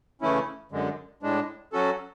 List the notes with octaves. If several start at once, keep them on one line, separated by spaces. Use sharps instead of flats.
C#3 E3 A3 C#4 E4
F#2 D3 G#3
A2 G#3 D4
F#3 C#4 F#4 A4